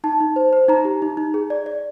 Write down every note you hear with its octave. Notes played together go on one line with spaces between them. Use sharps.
D#4 A5
D#4
C5
C5
D#4 A#5
G4
D#4
D#4
G#4
D5
D5